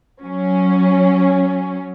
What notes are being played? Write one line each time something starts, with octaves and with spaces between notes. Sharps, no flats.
F#3 C#4